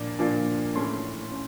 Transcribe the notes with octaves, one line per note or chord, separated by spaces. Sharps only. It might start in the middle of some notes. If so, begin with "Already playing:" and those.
Already playing: A#2 F3 A#3 D4
A#2 F3 A#3 D4
A2 E3 A3 C#4 C6
C#4